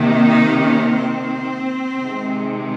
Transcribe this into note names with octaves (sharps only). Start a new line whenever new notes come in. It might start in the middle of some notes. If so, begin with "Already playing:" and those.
Already playing: C3 D#3 A#3
D#4
C#4
C4
C3 D#3 G#3